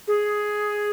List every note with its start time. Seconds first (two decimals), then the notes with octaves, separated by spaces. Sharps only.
0.08 G#4